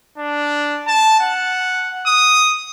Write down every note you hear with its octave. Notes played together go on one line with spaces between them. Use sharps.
D4
A5
F#5
D#6